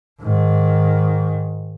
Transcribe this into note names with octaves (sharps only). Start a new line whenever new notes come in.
G#2 D#3